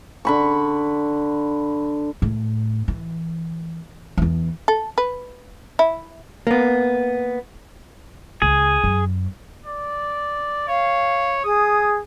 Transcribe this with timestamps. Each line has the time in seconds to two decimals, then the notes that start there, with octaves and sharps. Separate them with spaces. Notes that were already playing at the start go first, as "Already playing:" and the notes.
0.25 D3 B5 C#6
2.22 A2
2.88 E3
4.18 E2 E3
4.68 A4
4.98 B4
5.79 E4
6.47 A#3 B3
8.42 C#2 G#4
8.84 F#2
9.66 D5
10.68 C#5 F5
11.44 G#4 D#6